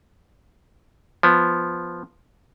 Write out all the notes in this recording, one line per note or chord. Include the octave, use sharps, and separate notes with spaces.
F3 B3